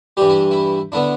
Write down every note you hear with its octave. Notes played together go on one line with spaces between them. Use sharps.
G2 E3 G3 G4
E4
E4
D3 B3 D4 E4